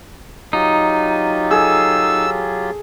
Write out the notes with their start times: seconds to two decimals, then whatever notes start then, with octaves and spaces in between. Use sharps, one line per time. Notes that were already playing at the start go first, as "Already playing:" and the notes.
0.53 F#3 D#4 F4 G4
1.51 G#4 A4 E6